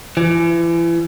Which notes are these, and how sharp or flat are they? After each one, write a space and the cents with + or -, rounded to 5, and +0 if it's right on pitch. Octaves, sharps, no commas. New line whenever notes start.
E3 +35